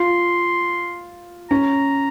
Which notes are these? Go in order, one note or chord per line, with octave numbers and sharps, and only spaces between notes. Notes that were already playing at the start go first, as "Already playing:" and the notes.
Already playing: F4 C6
C#4 A#5